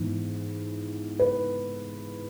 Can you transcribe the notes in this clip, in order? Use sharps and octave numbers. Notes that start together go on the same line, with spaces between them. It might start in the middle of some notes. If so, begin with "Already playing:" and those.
Already playing: G#2 E3 B3
B4